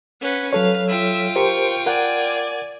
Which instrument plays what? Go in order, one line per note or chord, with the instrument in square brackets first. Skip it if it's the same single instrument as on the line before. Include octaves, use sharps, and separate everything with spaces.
[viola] C#4 B4 [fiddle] F#5
[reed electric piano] F#3 A4 C#5 [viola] B4 [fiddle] F5
[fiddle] F4 G5 [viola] E5
[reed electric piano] G4 A#4 C5 [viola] C#6
[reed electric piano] A#4 F#5 [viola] D5 G#5